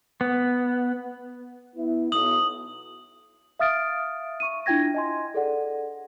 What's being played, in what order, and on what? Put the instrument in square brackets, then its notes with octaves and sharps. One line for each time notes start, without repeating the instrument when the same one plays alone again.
[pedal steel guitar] B3
[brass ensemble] B3 E4
[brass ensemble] B1 [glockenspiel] D#6 F#7
[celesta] E5 F5 D#6 F6 A6 D7
C#6 D#7
D4 E4 F4 G5 G#6 A#6
D#5 G#5 C6
G#4 A4 D5 F#5